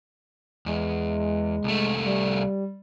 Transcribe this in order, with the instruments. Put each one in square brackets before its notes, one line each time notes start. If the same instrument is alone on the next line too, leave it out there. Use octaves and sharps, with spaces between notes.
[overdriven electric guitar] E2 [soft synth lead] G#3
[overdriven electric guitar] C2 A3
[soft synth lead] G3